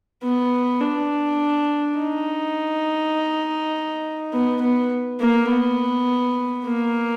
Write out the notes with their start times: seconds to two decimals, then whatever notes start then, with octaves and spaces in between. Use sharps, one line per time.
0.23 B3
0.81 D4
1.99 D#4
4.33 B3
4.61 B3
5.20 A#3
5.49 B3
6.66 A#3